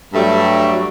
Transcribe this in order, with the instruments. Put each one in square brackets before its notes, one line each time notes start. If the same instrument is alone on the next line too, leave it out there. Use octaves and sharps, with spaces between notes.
[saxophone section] G2 F#3 G3 A3